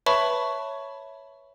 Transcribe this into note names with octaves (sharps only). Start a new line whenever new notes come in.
B4 C#5 E5 A5 B5 C#6